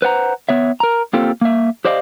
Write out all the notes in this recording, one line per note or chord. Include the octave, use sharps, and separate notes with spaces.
B4 C5 F#5 A#5
B3 C#5 E5
A#4 A#5
A#3 C4 F4 G4 A4
A#3 E5
G4 C5 D5 D#5 F5